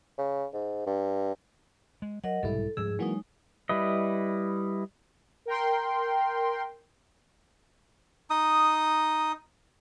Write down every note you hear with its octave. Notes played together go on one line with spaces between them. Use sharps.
C#3
G#2
G2
G#3
F#3 A#4 D#5 F#5
B1 G#2 C3 G3 E4 A4
G#2 F3 G3 G#4 E6
E3 F#3 G#3 A#3 D#4 F#4
G3 E4 B4 D#5
A#4 G5 C6
D#4 D#6